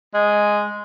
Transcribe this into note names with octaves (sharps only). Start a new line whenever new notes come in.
G#3